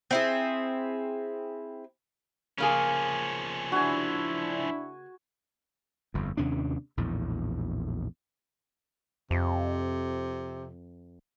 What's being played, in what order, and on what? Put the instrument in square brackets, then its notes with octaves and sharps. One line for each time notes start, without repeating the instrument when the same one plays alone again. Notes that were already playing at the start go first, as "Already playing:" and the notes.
[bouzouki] C4 E4 G#4
[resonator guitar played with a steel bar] C#3 A#3 G#4 [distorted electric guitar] F3 C#4
[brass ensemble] D4 E4 [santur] F#4 G#5
[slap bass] G1 F2
D#2 C3 C#4 D4
A#1 E2 A2
[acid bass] F2 [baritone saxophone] C3